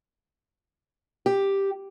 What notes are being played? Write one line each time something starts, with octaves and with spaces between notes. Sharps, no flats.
G4